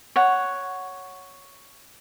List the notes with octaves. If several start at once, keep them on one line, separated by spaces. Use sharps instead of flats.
C#5 F#5